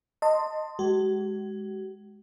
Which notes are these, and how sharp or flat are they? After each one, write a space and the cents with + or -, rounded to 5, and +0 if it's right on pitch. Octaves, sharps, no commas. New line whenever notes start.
D#5 -5 A5 +30 C6 +0
G#3 +0 F#4 +45